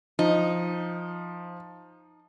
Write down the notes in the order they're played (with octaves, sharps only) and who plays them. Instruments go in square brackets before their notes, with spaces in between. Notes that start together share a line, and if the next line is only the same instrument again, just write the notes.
[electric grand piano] F3 [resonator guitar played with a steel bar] D#4